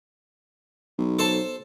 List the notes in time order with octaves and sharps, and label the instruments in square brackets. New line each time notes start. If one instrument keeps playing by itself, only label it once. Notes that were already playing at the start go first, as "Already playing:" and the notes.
[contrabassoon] B1
[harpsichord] A4 C5 A5